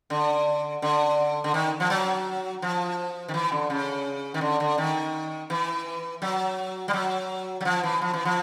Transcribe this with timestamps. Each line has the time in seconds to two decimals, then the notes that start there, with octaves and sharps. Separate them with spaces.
0.10 D3
0.82 D3
1.44 D3
1.54 D#3
1.80 F3
1.90 F#3
2.62 F3
3.28 D#3
3.34 E3
3.52 D3
3.70 C#3
4.34 D#3
4.41 D3
4.60 D3
4.78 D#3
5.50 E3
6.22 F#3
6.88 G3
6.93 F#3
7.61 F#3
7.65 F3
7.83 E3
8.01 F3
8.14 E3
8.25 F3